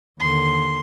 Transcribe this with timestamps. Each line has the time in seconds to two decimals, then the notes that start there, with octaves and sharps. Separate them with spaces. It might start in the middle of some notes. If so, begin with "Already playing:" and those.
0.20 D#2 D3 C6